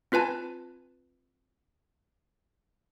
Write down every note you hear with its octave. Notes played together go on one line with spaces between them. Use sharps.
C4 F4 B4 G#5 A5